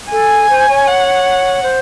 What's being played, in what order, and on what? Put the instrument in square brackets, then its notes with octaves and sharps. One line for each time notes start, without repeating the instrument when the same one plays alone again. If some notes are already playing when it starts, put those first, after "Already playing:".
[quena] A4 [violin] G#5
[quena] C5
C#5
[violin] F#5
[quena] C5